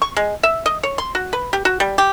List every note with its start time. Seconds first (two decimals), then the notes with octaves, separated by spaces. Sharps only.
0.02 C#6
0.17 G#3
0.43 E5
0.66 D#5
0.83 C#5
0.98 C6
1.15 F#4
1.33 B4
1.53 G4
1.65 F#4
1.80 G3
1.98 G4